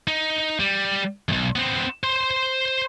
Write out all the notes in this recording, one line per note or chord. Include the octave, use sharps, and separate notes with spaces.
D#4
G3
B1 F2
B3 C4
C5 C6